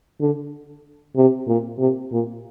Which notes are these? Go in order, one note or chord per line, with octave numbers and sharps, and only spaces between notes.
D3
C3
A#2
C3
A#2